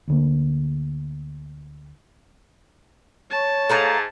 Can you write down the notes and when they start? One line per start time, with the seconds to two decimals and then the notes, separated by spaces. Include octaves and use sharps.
0.08 D2 D3 A#3
3.31 C#5 A5
3.70 G#2 A3 F5 A#5